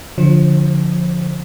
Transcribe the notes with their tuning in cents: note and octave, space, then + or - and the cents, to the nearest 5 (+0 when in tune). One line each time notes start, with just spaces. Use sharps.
D3 -20 F3 +0 C5 +40